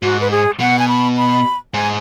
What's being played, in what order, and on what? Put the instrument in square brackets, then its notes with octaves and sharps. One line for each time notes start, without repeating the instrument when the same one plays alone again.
[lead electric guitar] G#2 [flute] F#4
[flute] B4
G#4
[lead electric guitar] B2 [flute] F#5
[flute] G#5
B5
B5
[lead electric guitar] G#2 [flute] G#5